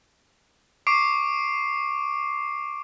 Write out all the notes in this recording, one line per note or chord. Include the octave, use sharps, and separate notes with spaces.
C#6 D6 C7 D7